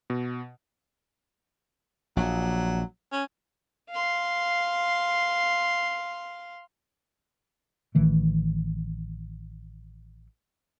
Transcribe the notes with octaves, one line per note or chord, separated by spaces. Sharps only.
B2
A#1 F#3
C#4
F5 C6
A1 D#3 E3 A3